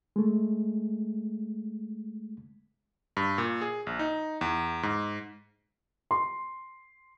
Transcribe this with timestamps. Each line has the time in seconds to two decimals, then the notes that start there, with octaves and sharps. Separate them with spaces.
0.16 G#3 A3
3.17 G2
3.38 A#2
3.61 G#4
3.87 A#1
3.99 D#4
4.41 E2
4.83 G#2
6.11 C6